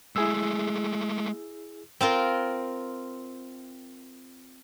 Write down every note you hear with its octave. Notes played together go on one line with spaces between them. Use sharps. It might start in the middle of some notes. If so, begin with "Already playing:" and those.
G#3 A3 E4 G#4 E6
C4 F4 A#4